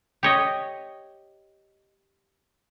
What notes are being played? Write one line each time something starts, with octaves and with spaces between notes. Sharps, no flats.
G4 C#5 D#5